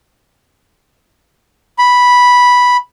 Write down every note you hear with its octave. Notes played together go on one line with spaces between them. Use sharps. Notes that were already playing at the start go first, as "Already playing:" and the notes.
B5